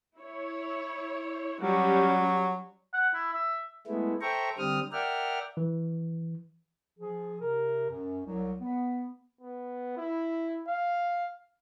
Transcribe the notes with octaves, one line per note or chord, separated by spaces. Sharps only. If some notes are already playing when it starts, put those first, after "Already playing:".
E4 C#5
F#3 G3 C#4 F#4
F#5
E4
E5
G#3 A3 B3 E4
A4 C5 E5 G5 A#5 C#6
D3 G3 C4 D#6 F6
A#4 D5 E5 F#5 G5 F6
E3
F3 G#4
C3 A#4
F#2
C2 F#3
B3
B3
E4
F5